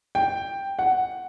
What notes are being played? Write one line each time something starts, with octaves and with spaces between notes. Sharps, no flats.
G5
F#5